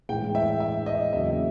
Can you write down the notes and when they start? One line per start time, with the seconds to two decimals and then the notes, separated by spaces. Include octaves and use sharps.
0.09 A2 E3 G#3 G5
0.35 E5
0.60 E5
0.86 D#5
1.13 E2 C#3 F#3 A#3 E5